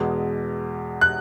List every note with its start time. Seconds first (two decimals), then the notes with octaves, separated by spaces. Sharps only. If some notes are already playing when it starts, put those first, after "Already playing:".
Already playing: E2 B2 G#3
1.01 F#6